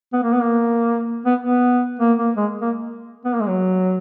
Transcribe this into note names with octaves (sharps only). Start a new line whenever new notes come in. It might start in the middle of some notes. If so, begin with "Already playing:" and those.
B3
A#3
B3
A#3
B3
B3
A#3
A#3
G#3
A#3
B3
A#3
G#3
F#3